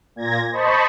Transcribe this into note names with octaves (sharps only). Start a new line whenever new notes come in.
A#2 G#6 A#6
C5 D#5 A5 B5 C#6